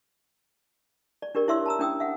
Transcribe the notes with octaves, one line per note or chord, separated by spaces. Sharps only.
D5
D4 G4 A#4 D5
E4 C#5 D5 E5 C6 E6
A5 A#5 E6
C#4 D4 G5 D#6 E6
E5 F#5